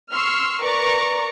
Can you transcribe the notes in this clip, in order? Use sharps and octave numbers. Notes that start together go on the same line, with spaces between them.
C6 C#6 E6 F6
A#4 B4 D5 A#5 C#6 D6